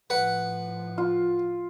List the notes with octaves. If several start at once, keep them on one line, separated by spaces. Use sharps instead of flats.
A2 F3 B4 F#5
F4